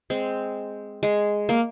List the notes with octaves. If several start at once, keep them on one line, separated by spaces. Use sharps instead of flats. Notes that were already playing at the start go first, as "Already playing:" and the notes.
G#3 C4
G#3
A#3